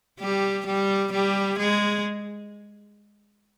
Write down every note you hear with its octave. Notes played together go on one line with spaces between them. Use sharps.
G3 G4
G3 G4
G3 G4
G#3 G#4